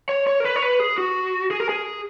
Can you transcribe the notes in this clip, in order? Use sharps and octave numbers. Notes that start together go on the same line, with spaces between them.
C#5
C#5
A#4
B4
C#5
B4
G#4
F#4
G#4
A#4
G#4